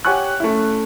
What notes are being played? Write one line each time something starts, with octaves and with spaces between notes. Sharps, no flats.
G4 C#5 F#5 G#5 C#6 F#6
A3 C#4 E4